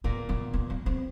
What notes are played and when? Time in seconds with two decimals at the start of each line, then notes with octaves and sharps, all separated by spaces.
0.04 A#2 A#3 B3
0.29 B3
0.53 B3
0.70 B3
0.86 C4